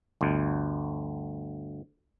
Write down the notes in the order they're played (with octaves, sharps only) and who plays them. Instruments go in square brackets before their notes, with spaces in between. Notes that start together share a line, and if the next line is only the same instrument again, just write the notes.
[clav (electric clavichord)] G1 D2